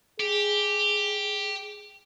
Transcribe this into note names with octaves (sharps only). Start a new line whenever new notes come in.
G4 G#4